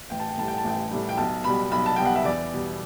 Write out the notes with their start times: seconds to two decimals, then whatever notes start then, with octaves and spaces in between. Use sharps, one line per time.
0.10 A1 G5
0.19 A5
0.29 G5
0.38 A2 G3 A5
0.48 G5
0.58 A5
0.65 A1 G5
0.91 A2 G3
1.09 G5
1.17 B1 A5
1.44 B2 G3 B5
1.71 B1 B5
1.86 A5
1.96 B2 G3 G5
2.05 F#5
2.16 E5
2.25 E2 D5
2.52 B2 G3